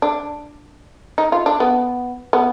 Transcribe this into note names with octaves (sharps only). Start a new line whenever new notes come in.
D4
D#4
F4
D4
B3
B3